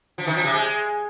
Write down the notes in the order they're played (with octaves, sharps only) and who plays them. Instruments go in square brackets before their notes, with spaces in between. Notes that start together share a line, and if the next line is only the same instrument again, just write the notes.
[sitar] F3
D#3
F3
C3
G#3